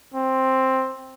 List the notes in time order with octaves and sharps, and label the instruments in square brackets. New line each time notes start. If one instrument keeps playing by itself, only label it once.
[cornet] C4